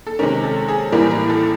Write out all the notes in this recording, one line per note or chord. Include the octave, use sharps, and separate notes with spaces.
A4
C3 D#3 G#3 C#4 A#4
A4
G#4
A2 E3 G3 A#3 A#4
A#4
A4